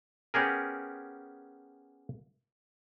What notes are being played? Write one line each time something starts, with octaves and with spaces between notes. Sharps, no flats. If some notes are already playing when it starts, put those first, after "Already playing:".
B3 C#4 G4 G#4 A#4